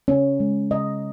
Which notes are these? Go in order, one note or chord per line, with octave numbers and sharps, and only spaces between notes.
C#3 C#4
G#3
C#3 D#5